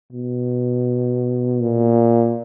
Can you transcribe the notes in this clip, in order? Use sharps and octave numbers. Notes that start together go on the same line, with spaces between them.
B2
A#2